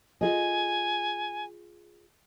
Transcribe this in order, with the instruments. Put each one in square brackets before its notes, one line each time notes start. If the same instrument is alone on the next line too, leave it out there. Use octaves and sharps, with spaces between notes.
[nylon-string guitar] F4 G#4 D#5 [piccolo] G#5